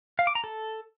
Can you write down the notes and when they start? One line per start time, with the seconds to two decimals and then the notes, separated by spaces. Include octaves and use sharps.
0.19 F5
0.27 D6
0.35 A#5
0.44 A4